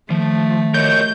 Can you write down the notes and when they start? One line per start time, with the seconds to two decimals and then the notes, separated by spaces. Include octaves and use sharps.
0.10 D#3 F3 A3
0.74 A#4 C#5 D#5 G6